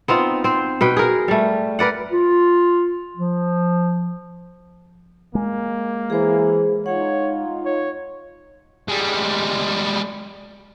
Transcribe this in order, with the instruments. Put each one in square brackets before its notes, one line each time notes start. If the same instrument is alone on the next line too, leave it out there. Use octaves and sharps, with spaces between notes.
[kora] B3 C4 D#4 F4
C4 C5
B2 B4 G5
G#4 A#4
G3 A3
A#4 B4 D5 F#5
[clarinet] F4
F3
[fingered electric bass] G#3 [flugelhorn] A#3
[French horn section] E3 [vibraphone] G#4 C5
[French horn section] D#4 F4 [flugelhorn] C#5 [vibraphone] F#5
[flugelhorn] C#5
[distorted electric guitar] G3 G#3